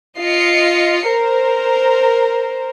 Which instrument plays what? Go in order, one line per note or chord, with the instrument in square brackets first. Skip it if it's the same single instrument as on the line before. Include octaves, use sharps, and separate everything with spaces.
[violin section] F4 D#5 C7 C#7
A#4 C5